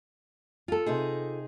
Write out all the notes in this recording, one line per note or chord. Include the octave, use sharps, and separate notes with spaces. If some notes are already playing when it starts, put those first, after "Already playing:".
F4 A4
C3 D#4 G#4